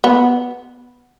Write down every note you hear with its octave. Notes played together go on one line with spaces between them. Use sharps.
B3